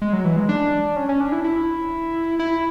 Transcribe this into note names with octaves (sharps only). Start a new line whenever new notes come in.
G#3
F#3
E3
G#3
D4
C#4
C#4
D4
E4
E4
E4